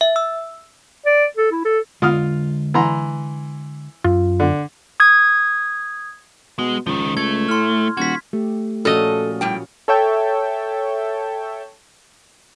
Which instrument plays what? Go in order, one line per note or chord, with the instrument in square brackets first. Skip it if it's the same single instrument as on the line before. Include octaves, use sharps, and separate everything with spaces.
[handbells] E5
E6
[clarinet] D5
A4
E4
A4
[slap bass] D3 G#3 [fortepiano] F4 D#6 F6
[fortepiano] E3 A#5 C6
[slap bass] F#2 [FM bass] F4
[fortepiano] D3
[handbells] D#6 G#6
[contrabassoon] B2 [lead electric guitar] G#3
[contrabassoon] C#2 [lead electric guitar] D#3 F3
[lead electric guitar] A3 [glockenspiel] G#6
[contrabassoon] A2 [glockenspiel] C6 F6
[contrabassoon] D#1 [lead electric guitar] F#4 [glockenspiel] G#6 B6
[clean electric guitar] A3 [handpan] G4
[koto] A#2 D#5 [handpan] F3 C#4 F#4 [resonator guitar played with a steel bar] A4
[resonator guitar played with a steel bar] A2 G3 G5
[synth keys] A4 C#5 E5 G5 A5